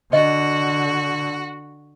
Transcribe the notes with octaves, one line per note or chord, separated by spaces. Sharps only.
D3 F#4 D#5